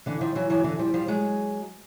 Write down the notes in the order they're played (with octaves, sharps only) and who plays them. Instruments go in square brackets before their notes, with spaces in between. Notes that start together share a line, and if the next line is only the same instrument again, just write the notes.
[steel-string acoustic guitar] D3 E3
D#3 F3
E3 F#3
E3 F#3
D3 E3
F3 G3
F3 G3
F#3 G#3